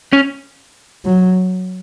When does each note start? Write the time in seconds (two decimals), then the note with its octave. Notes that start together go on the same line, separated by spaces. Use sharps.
0.13 C#4
1.05 F#3